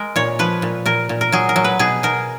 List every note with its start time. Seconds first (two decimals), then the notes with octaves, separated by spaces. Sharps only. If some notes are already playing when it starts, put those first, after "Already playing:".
Already playing: G#3 A#4
0.16 A#2 C#5
0.39 F3 B4
0.62 A#2
0.86 A#2 A#4
1.09 A#2
1.21 A#4
1.32 F#3 G#4
1.49 A#4
1.56 F#3
1.64 B4
1.79 B2 G#4
2.03 B2 A#4